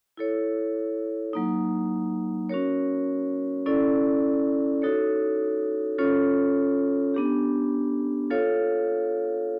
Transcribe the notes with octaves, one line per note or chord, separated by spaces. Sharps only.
E4 A4 C#5
F#3 A#3 D#4
C#4 F#4 A#4 C#5
C#4 E4 A4 D5
D#4 F#4 A4 C#5
C#4 F4 A4 C#5
B3 D4 G4
F4 A4 C#5 F5